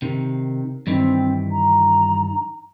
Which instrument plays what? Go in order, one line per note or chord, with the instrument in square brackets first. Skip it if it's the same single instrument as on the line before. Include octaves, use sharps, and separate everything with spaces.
[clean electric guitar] C3 D#3
[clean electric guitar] G2 D#3 E3 [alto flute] C4
[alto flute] A#5